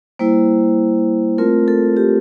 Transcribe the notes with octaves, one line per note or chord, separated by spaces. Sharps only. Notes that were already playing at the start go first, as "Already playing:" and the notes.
G3 A#3 E4 C5
A3 C4 F4 A#4
A4
G4